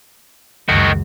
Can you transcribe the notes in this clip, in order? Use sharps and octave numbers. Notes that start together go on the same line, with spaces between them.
C#2 F#2 D#3 F#4